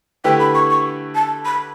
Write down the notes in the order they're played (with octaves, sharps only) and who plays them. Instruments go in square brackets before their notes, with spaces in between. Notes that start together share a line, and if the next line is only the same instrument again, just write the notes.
[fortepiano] D3 A3 E4 G4 B4 [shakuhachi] G5
[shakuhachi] B5
C#6
C#6
A5
B5